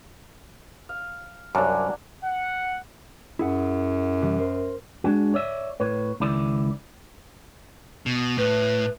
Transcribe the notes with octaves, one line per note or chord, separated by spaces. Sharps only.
F5
C2 F#2 F#3 A#3 D4
F#5
F#2 E4 G#4 F#5
C3 E3 G3
A#4 C5
G#3 D4 F#4
C#5 D5 E5
A2 B4 C#5
C#2 D#3 E4 D5
B2
A2 B4